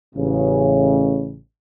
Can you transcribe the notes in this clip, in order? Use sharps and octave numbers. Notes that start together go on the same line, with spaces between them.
A1 C#3